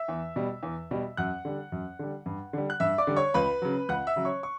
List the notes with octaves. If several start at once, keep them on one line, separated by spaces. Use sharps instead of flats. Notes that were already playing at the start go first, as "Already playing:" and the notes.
Already playing: E5 E6
E2
B2 G3
E2
B2 G3
F#2 F#5 F#6
D3 G3
F#2
D3 G3
G2
D3 G3
F#6
G2 E5 E6
D5 D6
D3 G3
C#5 C#6
C#2 B4 B5
C#3 F#3
C#2 F#5 F#6
E5 E6
C#3 F#3
C#5 C#6
C#6